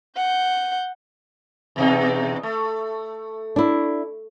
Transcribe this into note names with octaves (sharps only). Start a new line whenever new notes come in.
F#5 G6
E2 B2 D#4
A3
D4 E4